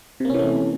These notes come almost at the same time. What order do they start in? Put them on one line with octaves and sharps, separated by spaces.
C3 A#3 C#4 E3 A3